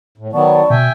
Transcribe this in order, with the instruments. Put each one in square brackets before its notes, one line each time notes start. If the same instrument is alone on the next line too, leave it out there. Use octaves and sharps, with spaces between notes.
[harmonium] A2
[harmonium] D#3 F#3 B3 [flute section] D5 A5 C#6
[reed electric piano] B2 [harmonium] E5 G5 G#5